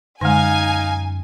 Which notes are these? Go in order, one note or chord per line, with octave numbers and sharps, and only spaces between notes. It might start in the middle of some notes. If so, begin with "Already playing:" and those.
F#2 D3 G#3 D#4 F5 G#5